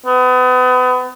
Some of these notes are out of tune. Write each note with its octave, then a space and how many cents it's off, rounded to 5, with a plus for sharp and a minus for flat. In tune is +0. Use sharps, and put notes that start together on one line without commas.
B3 +35